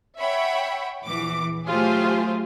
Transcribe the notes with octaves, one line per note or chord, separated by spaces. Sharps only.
C#5 E5 F#5 G5 B5
A#1 E2 E3 D6
F#3 A3 F4 G4 G#4 C5